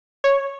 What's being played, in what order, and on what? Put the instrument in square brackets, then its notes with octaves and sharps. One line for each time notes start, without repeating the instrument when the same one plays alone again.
[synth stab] C#5